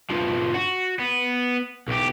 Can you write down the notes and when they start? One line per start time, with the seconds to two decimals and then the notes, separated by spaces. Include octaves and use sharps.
0.10 G2 F3
0.54 F#4
0.99 B3
1.88 B1 G4